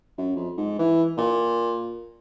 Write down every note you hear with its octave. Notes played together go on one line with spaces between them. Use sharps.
F#2
F2
G#2
E3
A#2